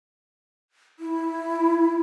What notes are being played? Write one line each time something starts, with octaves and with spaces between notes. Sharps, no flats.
E4